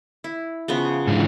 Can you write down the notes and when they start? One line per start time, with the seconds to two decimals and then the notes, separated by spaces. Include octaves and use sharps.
0.24 E4
0.68 C#3 F3 B3
1.07 G#2 D3 E3